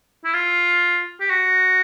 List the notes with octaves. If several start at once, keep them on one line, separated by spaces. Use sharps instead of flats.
E4
F4
G4
F#4